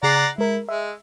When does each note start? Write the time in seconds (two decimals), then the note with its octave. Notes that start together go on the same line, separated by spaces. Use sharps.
0.03 C#3 G#4 D5 F#5 A#5 C7
0.38 G#3 E4 A#4
0.69 G#3 E5